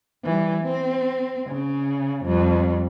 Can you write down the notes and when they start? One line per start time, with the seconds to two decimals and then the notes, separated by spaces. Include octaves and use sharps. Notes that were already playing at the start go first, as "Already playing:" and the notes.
0.24 E3 G3
0.64 C4
1.48 C#3
2.25 F2 G3